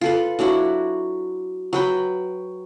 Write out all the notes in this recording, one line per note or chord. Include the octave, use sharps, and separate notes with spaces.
F4 A4 B4
F#3 D4 E4 F#4
F#3 B4 G5